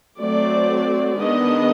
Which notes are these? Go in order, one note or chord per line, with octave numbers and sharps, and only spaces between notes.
F#3 A3 C4 D5
D#3 G#3 B3 D4 D#5